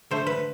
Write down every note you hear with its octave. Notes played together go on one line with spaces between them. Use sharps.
D3 A3 C5
B4